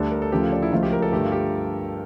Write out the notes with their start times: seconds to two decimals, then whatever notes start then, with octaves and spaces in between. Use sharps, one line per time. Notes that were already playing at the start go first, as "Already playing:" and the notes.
Already playing: D2 D3 G3 D4 A4
0.12 A#4
0.22 A4
0.32 D2 C#3 F3 G4
0.41 F4
0.52 D4
0.62 E4
0.71 C#2 C#3 F3 A3 F4
0.83 G4
0.92 A#4
1.02 A4
1.12 G2 D3 A3 G4
1.23 F4
1.32 G4